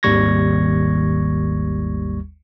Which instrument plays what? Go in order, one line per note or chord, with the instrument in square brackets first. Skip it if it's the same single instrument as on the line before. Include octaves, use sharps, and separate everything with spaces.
[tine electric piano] G#1 D#2 G3 C#6 G#6 A#6